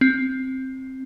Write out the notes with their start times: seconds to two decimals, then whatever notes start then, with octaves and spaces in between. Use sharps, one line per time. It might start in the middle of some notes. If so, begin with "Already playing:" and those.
0.01 C4